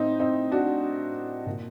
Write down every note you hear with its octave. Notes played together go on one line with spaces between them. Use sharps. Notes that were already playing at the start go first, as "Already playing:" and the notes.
Already playing: A2 C4 D#4
C4 D#4
D4 F#4
A#2